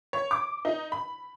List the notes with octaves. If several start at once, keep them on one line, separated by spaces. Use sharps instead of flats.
C#5
D6
D#4
B5